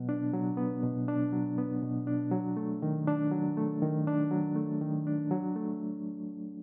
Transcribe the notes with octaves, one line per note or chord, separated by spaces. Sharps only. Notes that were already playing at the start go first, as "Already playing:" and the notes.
Already playing: B2 F#3 B3
D4
F#3
B3
B2
D4
F#3
B3
B2
D4
F#3
A3
D#3
D4
F#3
A3
D#3
D4
F#3
A3
D#3
D4
F#3
A3